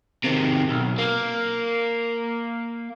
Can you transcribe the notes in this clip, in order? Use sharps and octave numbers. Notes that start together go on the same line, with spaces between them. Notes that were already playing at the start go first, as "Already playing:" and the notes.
C3 D#3
B1
A#3